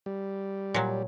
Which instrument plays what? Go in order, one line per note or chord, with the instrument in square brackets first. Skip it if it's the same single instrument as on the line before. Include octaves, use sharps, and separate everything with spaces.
[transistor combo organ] G3
[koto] A#2 F#3